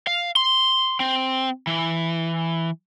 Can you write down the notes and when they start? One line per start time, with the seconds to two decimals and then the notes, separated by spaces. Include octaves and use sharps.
0.07 F5
0.36 C6
1.00 C4
1.67 E3